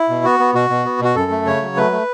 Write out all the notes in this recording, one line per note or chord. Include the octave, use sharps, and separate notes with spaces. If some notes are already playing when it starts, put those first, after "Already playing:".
Already playing: E4
B2
B3 F#4
B3
B2 F#4
B2
B3
B2 F#4
F#2 A4
A3
C#3 C#5
F#3
A3 B4
A3